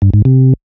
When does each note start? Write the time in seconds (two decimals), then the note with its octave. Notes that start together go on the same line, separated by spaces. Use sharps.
0.02 G2
0.14 G#2
0.25 C3